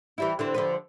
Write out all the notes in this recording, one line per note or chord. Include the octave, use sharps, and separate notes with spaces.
E3 G3 E4
D3 E3 C4
D3 F3 B4